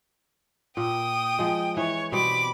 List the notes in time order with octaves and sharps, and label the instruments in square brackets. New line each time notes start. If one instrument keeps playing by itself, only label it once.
[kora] A#2 [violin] G5 D#6
[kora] F3 G#3
[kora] E3 [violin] C#5
[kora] B2 G3 C4 [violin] B5 D6